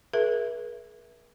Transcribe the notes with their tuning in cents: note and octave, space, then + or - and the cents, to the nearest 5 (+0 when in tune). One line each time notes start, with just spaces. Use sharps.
G#4 +35 B4 -45 E5 +0